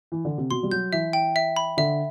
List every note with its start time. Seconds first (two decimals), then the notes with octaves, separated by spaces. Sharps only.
0.12 E3
0.25 D3
0.38 C3
0.51 B2 C6
0.63 G3
0.71 F#3 G6
0.92 E3 E5
1.13 G5
1.36 E5
1.56 B5
1.77 D3 E5